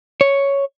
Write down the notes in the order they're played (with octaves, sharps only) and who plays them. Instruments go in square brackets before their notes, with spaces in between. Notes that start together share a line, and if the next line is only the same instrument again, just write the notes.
[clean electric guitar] C#5